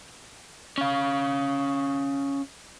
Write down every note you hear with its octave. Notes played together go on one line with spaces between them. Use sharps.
C#4 F5